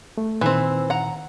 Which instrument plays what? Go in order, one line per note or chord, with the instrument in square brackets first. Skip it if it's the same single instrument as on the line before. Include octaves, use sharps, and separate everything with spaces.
[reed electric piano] A3
[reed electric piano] A#2 D#3 [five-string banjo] E3 C4
[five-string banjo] F#5 A#5